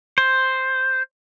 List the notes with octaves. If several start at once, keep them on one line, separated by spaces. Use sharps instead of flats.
C5